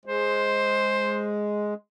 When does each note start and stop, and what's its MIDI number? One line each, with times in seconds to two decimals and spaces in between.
0.05 1.74 56
0.05 1.37 72